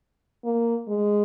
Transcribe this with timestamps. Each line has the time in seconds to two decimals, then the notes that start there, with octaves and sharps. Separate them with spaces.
0.44 A#3
0.88 G#3